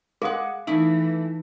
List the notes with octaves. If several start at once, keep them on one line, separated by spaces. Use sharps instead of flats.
G#3 G#4 F5 F#5 D#6
E3 A3 D#4 E4